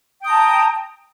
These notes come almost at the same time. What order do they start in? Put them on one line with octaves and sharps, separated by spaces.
G5 D#6 A#5 A5